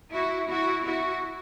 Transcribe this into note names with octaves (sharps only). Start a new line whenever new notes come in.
E4 F#4
E4 F#4
E4 F#4